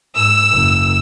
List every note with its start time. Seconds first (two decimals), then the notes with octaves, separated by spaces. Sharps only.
0.17 G#2 E6
0.51 F#1